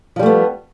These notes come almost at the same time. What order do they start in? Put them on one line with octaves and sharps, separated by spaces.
F3 G3 A3 B3